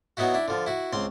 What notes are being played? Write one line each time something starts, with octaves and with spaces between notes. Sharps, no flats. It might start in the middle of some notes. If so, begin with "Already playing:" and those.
F#3 B3 D#4 E4 F#4
D4 E4
D3 F3
E4 F#4
C#2 C4 C6